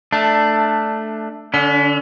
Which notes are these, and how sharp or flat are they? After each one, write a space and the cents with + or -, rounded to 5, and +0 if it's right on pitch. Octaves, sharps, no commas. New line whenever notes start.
A3 +0 D4 +10
D3 +0 C#4 +45